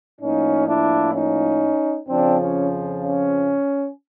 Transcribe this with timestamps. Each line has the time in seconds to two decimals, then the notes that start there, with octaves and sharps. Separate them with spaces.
0.20 A2 F3 A#3 C#4 D#4
0.68 D4 E4
1.14 C#4 D#4
2.08 F2 C#3 F3 C4 D4
2.39 C#4
3.03 C#4